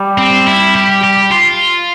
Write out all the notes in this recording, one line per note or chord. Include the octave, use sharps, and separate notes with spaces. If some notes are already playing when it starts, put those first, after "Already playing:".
Already playing: G3
C4
E4
G4
G4
F4